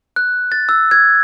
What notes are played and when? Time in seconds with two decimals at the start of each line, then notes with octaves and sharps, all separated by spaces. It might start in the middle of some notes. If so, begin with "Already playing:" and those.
0.16 F#6
0.52 A6
0.69 E6
0.91 G#6